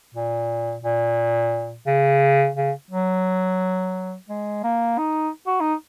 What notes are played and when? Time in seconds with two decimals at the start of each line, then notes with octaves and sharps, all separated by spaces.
0.14 A#2
0.84 A#2
1.87 C#3
2.56 C#3
2.91 F#3
4.29 G#3
4.64 A#3
4.98 D#4
5.47 F#4
5.60 D#4